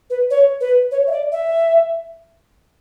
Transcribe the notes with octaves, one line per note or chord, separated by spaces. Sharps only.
B4
C#5
B4
C#5
E5
D5
E5